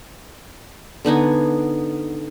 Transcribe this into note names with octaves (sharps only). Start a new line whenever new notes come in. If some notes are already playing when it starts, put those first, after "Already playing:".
D3 B3 D#4 G#5